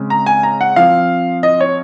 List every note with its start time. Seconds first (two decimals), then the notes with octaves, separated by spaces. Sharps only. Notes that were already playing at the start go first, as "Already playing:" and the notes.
Already playing: C#3 G#3 C4
0.10 A#5
0.26 G#5
0.43 A#5
0.61 F#5
0.76 F3 C4 F5
1.43 D#5
1.61 C#5